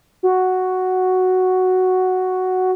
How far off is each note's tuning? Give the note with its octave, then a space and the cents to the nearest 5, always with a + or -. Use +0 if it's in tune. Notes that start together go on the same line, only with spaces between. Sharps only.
F#4 +0